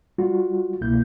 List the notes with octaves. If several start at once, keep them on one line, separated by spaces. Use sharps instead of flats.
G3 F4 F#4
C2 B2 A#3 E4 G6